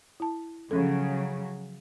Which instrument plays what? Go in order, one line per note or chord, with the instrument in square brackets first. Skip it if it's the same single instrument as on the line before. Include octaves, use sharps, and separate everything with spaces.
[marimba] E4 A5
[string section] C#3 F#3 [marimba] F3 C#4 A4